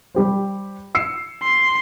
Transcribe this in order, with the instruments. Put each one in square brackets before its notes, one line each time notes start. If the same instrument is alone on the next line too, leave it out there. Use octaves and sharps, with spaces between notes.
[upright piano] G3 G4 C5
E6 C7 C#7
[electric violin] C6